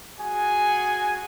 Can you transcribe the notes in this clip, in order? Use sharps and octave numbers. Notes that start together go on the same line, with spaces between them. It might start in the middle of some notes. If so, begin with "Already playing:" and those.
F#4 G#4 G#5